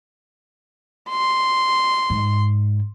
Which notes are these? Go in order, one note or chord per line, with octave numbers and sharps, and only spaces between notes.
C6
G#2